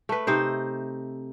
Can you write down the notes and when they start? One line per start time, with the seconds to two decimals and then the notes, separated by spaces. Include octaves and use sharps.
0.09 A3 B4
0.27 C3 D#4 C5